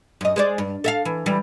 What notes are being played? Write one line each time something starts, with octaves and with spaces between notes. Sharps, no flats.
F#2 D#5
G#3 C5 D5
G2
A4 E5 F5
E3
E3 G3